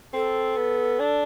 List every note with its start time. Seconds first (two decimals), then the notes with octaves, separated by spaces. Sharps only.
0.14 C4 A4
0.56 B3
1.00 D4